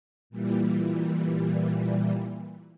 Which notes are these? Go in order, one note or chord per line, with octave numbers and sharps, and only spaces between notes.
A#2 E3 G3